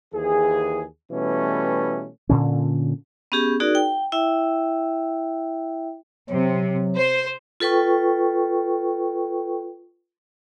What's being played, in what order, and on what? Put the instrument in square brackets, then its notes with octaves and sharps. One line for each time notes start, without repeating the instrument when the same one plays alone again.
[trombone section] D#2 E3 G#4
B2 E3 G3 A3 C#4
[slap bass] A#2 D3 C#4
[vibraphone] B3 C#4 G4 G#4
D#4 F#4 G#4 A#4 D5
G5
E4 E5 G5
[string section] C3 [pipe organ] F#3
[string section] C5
[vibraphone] F4 A4 B4 G5 C#6